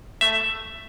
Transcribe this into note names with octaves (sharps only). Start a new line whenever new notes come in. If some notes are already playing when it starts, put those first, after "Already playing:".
A3 E5